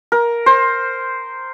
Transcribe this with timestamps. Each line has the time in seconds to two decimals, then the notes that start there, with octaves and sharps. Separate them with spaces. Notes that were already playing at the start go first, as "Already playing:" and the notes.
0.12 A#4
0.46 C5